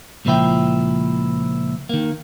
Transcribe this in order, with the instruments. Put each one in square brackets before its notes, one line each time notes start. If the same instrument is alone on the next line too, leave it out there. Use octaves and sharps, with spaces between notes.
[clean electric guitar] C#2 A#2 F3 E4 G5
D#3 A#3